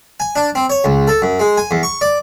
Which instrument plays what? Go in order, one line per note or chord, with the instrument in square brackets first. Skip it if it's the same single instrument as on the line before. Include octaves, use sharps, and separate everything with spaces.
[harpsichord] G#5
D4
C4
C#5
C#2
A4
F#2
G#3
G#5
E2
C#6
D5